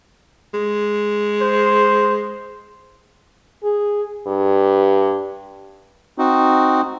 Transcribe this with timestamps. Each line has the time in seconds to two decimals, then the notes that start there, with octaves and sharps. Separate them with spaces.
0.54 G#3
1.41 C5
3.63 G#4
4.27 G2
6.18 C4 D#4 F#4